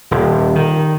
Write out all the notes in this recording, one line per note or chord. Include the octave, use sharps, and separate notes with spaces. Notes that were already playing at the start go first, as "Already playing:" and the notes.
D#1
D#3